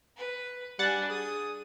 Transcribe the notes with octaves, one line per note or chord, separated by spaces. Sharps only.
B4
G3 D4 F#5 G#5 A6
G#4 D#6